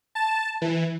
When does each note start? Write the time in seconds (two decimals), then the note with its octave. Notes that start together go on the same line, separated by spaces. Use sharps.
0.15 A5
0.62 E3